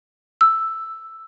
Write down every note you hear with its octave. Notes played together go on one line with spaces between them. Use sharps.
E6